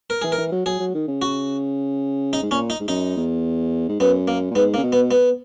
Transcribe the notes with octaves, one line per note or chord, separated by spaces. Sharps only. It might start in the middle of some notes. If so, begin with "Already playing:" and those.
A#4
E3 G#4
A#4
E3
F#3
F#3 G#4
F#3
D#3
C#3
F#4
D#4
G#2
A#2 C#4
D#4
G#2
F#2 D#4
E2
G#2
F#2 B3
A#3
A#2
G#2 B3
A#3
C#3
B2
B3
B3